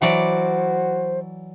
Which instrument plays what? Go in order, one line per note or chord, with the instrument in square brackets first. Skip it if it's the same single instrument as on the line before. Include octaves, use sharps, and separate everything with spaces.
[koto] E3 F#3 D5 [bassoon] F#4 [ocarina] C5